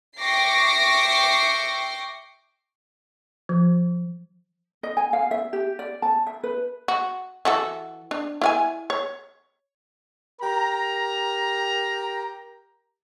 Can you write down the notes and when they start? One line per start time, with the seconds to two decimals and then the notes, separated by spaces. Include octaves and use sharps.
0.19 E5 G5 C#6 D6 A#6 C7
3.49 F3
4.83 D#5
4.97 G#5
5.13 F5
5.31 E5
5.53 G4
5.79 D5
6.02 A5
6.27 E5
6.43 B4
6.88 F#4
7.45 E3 F#4 A4
8.11 D4
8.42 E4 F5 G#5
8.90 C#5
10.41 G4 A#4 A#5